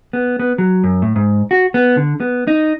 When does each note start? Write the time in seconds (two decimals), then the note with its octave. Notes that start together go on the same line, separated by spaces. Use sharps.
0.13 B3
0.39 B3
0.58 F#3
0.84 F#2
1.02 A2
1.16 G#2
1.51 F#4
1.74 B3
1.97 D3
2.20 B3
2.47 D#4